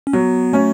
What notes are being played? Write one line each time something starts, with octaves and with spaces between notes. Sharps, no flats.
C#4
F#3 B3
A3 C#4